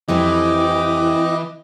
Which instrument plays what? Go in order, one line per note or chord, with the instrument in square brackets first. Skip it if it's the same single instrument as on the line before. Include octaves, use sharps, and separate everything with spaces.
[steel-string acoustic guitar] F2 G3 C4 [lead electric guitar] E3 [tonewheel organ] E4 G5 [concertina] D#5 D6